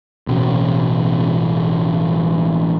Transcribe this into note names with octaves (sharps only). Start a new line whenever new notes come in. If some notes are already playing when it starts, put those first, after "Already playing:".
A1 B2 C#4